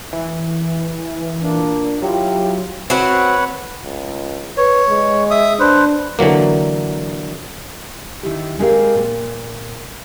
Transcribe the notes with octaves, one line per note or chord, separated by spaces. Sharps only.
E3
A#2 A#3 D4
F#3 E4 F4 G4
C4 F#4 B4 C#5 F#5
C#2
B4 C#5
G#3
E5 D#6
D4 B4 C5
D3 E3 F#3 A#3
D#3 E4 G4
G#3 C4 G4 G#4 A#4 F5
A#2